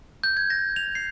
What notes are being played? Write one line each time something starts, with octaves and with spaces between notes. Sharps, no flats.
G6
G#6
A#6
F7
C7